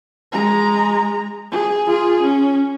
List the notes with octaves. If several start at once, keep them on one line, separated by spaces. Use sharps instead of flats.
G#3 A#5
G#4
F4 G#4
C#4